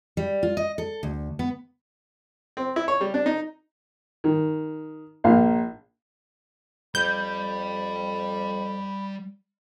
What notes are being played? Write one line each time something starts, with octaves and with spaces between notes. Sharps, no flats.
G3
F4
D#5
A4
D2
B3
C4
E4
C#5
G3
D4
D#4
D#3
A#1 A#2 A#3 F5
F2 G3 B5 G6